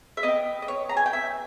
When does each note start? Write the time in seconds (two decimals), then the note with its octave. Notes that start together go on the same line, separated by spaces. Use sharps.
0.17 E5
0.23 B3 G4 D#5
0.62 D#5
0.68 C#5
0.89 A#5
0.97 G#5
1.06 G5
1.13 E5